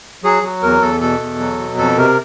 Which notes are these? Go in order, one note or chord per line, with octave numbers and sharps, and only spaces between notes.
F#3 G#4
F#3
E2 A#4
E2 A4
B2 A4
E2
F#3
B2
F2 A4
C3 A#4